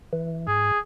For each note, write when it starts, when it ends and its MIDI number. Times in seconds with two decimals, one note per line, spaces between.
0.13 0.47 52
0.47 0.71 44
0.47 0.79 68